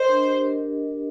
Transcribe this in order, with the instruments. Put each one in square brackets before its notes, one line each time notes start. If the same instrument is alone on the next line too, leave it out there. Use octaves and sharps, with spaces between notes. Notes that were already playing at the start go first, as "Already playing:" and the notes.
Already playing: [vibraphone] A#4 D#5 [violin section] C5
[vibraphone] D4
G4
A#4